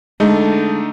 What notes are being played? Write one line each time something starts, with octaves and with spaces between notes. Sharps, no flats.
D3 G#3 A3 D#4